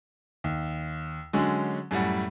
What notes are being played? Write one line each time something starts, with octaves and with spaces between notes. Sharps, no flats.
D#2
D3 F#3 G#3 C#4
F#2 A2 G3 F#5